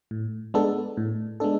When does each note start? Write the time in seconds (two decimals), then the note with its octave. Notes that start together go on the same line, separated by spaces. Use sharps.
0.11 A2
0.54 G#3 B3 D4 A4
0.97 A2
1.40 G#3 B3 D4 A4